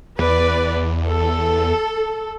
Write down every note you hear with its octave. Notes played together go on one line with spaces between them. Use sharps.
E2 B4 D5
A4